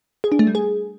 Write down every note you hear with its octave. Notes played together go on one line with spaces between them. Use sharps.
G#4
D4
A3
G3
G#4